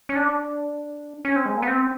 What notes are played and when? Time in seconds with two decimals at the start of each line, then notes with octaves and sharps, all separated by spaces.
0.09 C#4
0.16 D4
1.25 C#4
1.36 C4
1.46 G#3
1.57 A#3
1.62 B3
1.67 C4